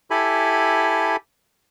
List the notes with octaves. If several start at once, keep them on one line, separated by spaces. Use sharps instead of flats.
E4 G4 A4 G#5 B5